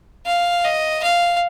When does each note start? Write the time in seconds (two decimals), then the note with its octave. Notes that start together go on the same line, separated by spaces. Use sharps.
0.26 F5
0.64 D#5
1.03 F5